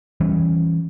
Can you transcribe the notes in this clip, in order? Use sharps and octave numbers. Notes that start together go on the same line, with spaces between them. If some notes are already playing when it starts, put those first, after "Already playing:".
E3 G3 C#4